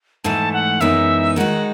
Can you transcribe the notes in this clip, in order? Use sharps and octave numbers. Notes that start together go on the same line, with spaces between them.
G#2 E3 A3 A5
F#5
F#2 E3 G#3 B3 D#4 E5
D#3 G#3 D#4 F#4 F#5